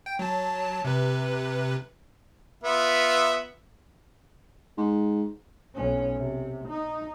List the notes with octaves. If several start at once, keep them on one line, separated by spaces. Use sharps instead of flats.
G5
F#3 A5
C3 B4
B3 F4 E5
G#2
B1 C#4
C3
D#4